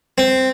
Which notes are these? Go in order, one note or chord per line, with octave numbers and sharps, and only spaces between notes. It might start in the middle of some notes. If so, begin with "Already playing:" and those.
C4